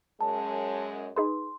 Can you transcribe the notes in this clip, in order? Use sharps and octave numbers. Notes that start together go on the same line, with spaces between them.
F#2 G#3 C#4 A5
D#4 G#4 B4 C6